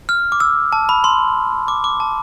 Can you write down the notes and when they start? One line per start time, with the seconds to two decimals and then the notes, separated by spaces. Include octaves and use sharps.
0.09 F6
0.32 D6
0.40 E6
0.72 A5
0.89 B5
1.04 C6
1.68 D6
1.84 D6
2.00 A5